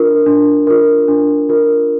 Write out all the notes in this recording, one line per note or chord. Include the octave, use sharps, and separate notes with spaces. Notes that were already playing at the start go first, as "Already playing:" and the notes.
Already playing: D4 F4 A#4
D4
F4 A#4
D4
F4 A#4